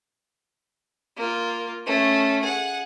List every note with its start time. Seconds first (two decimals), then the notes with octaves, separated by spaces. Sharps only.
1.17 A#3 F4
1.86 A3 C#4
2.42 G#4 F#5